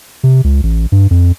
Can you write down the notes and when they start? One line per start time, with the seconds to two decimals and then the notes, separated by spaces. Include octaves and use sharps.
0.23 C3
0.44 C#2
0.63 A1
0.92 G2
1.11 F2